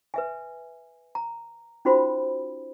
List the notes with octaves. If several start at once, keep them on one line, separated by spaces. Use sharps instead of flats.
B4 E5 G#5
A#5
C#4 D#4 F4 F#4 C5 B5